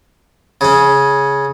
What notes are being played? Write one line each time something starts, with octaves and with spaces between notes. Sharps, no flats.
C#3 C#4